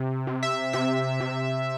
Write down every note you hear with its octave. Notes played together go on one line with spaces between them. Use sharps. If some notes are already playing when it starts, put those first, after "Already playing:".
Already playing: C3
C3
E5
C3 E5
C3